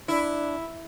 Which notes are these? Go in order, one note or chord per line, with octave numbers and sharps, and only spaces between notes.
D4 E4